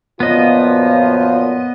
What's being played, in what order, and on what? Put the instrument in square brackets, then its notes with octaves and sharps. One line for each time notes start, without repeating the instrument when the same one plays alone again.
[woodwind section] F#2 A#2 F3 [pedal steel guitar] B3 D#5 [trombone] F4